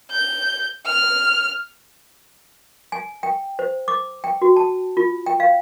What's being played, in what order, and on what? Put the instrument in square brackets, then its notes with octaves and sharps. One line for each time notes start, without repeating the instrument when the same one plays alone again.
[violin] G6
F6
[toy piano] G#5
G5
C5
D6
G5
F#4
A5
F4
G5
F5